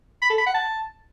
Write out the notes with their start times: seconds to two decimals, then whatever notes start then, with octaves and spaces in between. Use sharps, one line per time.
0.22 B5
0.30 A4
0.38 B5
0.46 F#5
0.54 A5